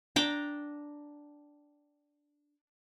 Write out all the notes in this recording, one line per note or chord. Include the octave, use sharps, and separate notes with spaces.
D4 G5 A#5 D6